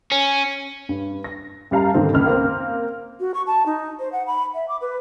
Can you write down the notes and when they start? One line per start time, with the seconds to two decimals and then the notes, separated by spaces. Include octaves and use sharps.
0.12 C#4
0.89 G2
1.24 A#6
1.71 F#2 G3 F5 A5 A#5
1.94 G#2 D3 D#3 C4
2.13 F#1 C#2 F6
2.26 A#3 C4
3.20 F#4
3.34 C#6
3.47 A5
3.66 D#4
4.00 C5
4.12 F#5
4.27 B5
4.55 E5
4.69 D6
4.81 B4